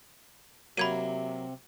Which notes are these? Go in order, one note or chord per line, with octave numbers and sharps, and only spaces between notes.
C3 F#3 A#3 B5 G#6 D#7